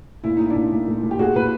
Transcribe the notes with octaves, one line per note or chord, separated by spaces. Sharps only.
A#2 E4
A#2 D#4
D4 E4
A#2
A#2
A#2
A#2
G4
A#2 F#4 G#4
A#2 B4